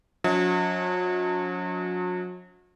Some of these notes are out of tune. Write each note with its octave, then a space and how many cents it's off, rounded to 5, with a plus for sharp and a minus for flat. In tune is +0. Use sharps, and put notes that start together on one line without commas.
F#3 -40 C#4 +40 D#5 +35